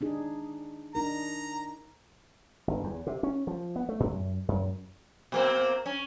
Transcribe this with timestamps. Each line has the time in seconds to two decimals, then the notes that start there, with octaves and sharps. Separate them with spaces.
0.01 D4 D#4 G#4
0.95 D4 D#4 A#4 A#5
2.68 G1
2.84 E2
3.07 C3
3.23 C#4
3.47 F3
3.76 B3
3.89 A3
4.00 A2
4.12 F#2
4.48 F#2
5.32 B2 A#3 C4
5.86 C#4